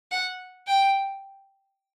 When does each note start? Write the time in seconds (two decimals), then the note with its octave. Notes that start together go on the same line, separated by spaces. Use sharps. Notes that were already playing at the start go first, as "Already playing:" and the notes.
0.11 F#5
0.67 G5